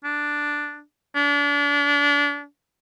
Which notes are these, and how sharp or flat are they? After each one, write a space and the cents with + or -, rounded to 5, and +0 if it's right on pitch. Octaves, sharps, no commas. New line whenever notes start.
D4 +0
D4 -35